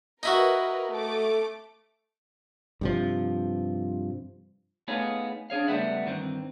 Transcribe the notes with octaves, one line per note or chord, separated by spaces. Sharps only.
D#4 E4 F#4 A#4 B4
A3 D6
G2 C3 F3
A3 B3 D#4 G#4 C#5 F5
D4 G#4 C#5 F5
C#2 G3 A3 B3 E5 F#5
G2 D#3 E3 C4